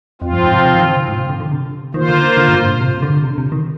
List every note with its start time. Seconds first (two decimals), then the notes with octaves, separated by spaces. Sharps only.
0.21 F2 F3 C4 F4
0.33 G2
0.43 G#2
0.54 C3
0.65 C3
0.76 D#3
0.86 D3
0.97 C3
1.08 G#2
1.19 C3
1.29 D3
1.40 D3
1.51 C3
1.94 D#3 A#3 F4 C5
2.09 D3
2.37 D3
2.48 G2
2.60 G#2
2.70 A#2
2.81 C3
3.02 D3
3.24 C3
3.38 C3
3.52 D#3